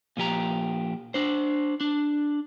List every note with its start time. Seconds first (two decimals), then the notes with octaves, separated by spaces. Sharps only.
0.17 A#2 F3 G4 A#5
1.14 D4 C5
1.81 D4